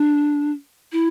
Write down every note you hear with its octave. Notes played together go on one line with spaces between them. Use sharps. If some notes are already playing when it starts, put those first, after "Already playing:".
Already playing: D4
E4